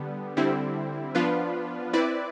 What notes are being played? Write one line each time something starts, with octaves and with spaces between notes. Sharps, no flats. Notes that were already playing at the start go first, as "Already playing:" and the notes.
Already playing: D3 G3 B3
D3 G3 C4 E4
F3 B3 D4 F4 B4
C4 E4 B4 D5